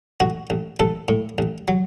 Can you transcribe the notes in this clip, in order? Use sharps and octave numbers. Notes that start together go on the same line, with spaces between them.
A1 F#4
A1
A1 A4
A2
A1
F#3